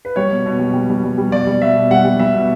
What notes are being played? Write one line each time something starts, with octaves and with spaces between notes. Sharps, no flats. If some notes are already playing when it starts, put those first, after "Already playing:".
B4
G3 C#5
B2
B2
G3
G3
G3
G3
G3
B2 D5
G3
B2 E5
B2
G3 F#5
G3
G3 E5
B2